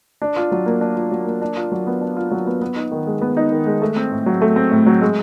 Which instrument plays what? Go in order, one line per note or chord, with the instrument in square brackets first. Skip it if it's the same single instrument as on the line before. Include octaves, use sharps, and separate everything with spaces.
[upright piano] D4
F4
F#3
A#3
D4
F4
F#3
A#3
D4
F4
F#3
B3
D4
F4
F#3
B3
B3
D#4
D#3
G#3
B3
D#4
D#3
G#3
A3
C4
A2
F#3
A3
C4
A2
F#3
G#3